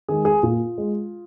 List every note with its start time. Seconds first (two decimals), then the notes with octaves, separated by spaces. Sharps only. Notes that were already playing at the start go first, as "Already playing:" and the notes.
0.09 D#3 G#3 G#4
0.25 G#4
0.43 A#2 F4
0.78 G#3